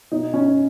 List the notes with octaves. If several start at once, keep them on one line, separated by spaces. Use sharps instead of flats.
B2 D#4
C#4